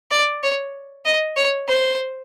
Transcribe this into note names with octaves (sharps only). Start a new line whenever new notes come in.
D5
C#5
D#5
C#5
C5